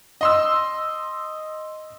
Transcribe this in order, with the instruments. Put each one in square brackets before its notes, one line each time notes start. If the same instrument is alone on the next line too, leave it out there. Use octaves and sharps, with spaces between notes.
[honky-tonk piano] D#5 C6 E6